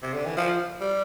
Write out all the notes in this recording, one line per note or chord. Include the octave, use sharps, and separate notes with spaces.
C3
D3
E3
F3
G3